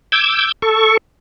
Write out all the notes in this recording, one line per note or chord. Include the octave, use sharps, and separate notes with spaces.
D6 E6 G6 G#6
A4 C#6